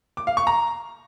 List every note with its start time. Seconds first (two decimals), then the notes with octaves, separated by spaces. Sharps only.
0.17 D6
0.27 F5
0.37 C#6
0.47 A#5